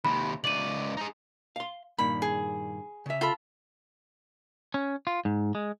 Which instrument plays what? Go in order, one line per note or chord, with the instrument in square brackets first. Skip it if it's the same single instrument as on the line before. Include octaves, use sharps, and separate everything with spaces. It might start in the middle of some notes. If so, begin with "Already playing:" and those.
[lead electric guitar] D#2 C3 [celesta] B5
[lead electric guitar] C#2 D5 [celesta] D#7 F#7
[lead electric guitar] D#4 G#4
[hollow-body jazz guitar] F5 C6
[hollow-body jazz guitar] G2 A#2 D#3 [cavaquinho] B5
[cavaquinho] G#4
[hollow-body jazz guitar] C#3 E5
[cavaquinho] F4 A4 B5
[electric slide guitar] C#4
F4
G#2
G#3